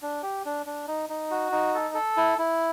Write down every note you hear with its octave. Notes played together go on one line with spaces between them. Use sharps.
D4
G4
D4
D4
D#4
D#4
F#4
D#4
A4
A4
E4
E4